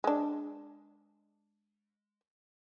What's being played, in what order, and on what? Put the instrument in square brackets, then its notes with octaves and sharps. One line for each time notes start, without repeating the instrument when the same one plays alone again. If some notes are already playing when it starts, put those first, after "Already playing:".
[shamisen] G#3 D4